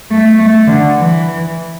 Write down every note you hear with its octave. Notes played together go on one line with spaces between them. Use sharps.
A3
A3
D3
E3